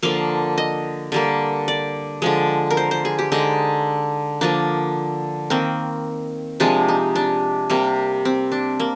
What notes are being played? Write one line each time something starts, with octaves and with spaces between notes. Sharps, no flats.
D3 F3 A#3 F5
D#5
D3 G3 A#3
D5
D3 F3 G#3
A#4
C5
C5
G#4
G4
D3 G#3 D#4
D3 F3 A#3 D4
D#3 A#3 C4
C3 F3 G#3 D4
D#4
D4
C3 G3 A#3
C4
D4
A#3